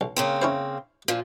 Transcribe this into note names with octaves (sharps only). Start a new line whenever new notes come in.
B1
C#3 A#3 C4
C#4 E4 C5
A#2 F3